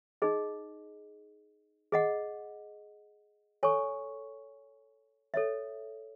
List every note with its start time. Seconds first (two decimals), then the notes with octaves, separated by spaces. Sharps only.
0.22 D#4 G#4 D#5
1.92 G#4 D#5 F#5
3.63 A4 C#5 G#5 C#6
5.34 A4 C#5 E5